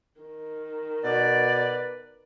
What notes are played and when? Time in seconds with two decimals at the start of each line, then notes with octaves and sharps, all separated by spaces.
0.21 D#3
1.04 B2 B4 D5